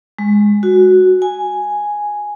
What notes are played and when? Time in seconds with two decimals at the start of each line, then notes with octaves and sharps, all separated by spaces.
0.19 G#3
0.63 F#4
1.22 G#5